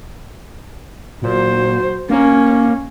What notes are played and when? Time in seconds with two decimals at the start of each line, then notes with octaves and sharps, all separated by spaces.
1.22 A#2 F#3 C5
2.10 A#3 C#4